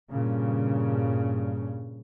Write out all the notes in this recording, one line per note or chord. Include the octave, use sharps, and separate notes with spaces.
G2 A#2 C#3